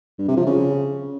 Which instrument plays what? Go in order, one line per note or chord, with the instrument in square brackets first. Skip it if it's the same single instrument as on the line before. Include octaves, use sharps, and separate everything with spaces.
[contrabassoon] G2
C3
F3
C#3